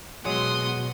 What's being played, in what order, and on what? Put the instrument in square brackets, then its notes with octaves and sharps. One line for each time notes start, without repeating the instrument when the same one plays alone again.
[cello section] B2 [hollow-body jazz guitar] F#3 G#3 [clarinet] F#5 [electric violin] C6 D#6